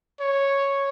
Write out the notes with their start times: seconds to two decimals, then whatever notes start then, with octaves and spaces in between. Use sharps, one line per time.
0.20 C#5